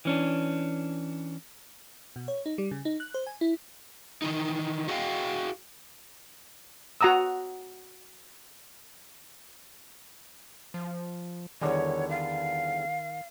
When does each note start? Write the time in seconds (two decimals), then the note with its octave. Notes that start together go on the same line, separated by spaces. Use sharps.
0.05 E3 C#4 D4
2.16 B2
2.28 C#5
2.46 D#4
2.58 G3
2.71 C#3
2.85 D#4
3.00 F#6
3.14 C5
3.27 G#5
3.41 E4
4.22 D#3 E3 D#4
4.88 F#4 G#4 D#5 F5 G5
7.01 F#4 F#5 A#5 D#6 E6
10.74 F3
11.61 E2 D3 D#3 G3 C#5
12.09 F5